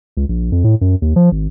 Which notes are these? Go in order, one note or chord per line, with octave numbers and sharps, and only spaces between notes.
C#2
A#1
F2
A2
F#2
D#2
F3
G#1